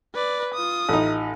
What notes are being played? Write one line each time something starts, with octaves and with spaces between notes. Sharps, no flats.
B4 D5
F4 D#6
A1 D#4